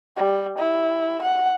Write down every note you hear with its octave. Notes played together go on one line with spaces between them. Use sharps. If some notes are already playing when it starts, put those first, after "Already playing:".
G3
E4
F#5